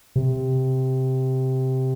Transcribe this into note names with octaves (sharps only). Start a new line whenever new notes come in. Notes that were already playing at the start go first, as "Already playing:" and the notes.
C3